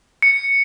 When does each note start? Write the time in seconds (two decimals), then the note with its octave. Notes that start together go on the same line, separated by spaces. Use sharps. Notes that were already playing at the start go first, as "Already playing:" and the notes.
0.22 C#7